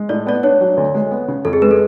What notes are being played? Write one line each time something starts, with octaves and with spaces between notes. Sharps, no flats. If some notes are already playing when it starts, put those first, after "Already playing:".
Already playing: G#3
A2 D5
B3 D5
D4 C#5
F#3
D2
G#3
B3
C#3
F2 A4
G#4
G#3 B4
A4